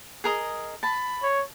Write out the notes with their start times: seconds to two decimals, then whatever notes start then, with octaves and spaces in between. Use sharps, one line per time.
0.24 G#4 A#4 D#5
0.83 A5 B5
1.23 C#5